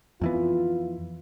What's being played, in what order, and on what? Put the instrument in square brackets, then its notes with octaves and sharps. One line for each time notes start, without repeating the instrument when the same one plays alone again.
[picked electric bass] F2 E3 B3 [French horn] F4